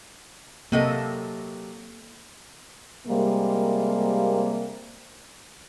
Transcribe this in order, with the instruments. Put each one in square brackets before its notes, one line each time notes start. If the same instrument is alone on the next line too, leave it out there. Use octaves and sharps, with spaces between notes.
[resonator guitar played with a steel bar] C3 F#3 D#5 [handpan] A#3 A4
[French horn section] C3 G3 G#3 A#3